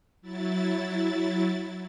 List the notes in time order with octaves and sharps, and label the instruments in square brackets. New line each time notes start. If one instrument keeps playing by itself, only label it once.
[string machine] F#3 E4 A6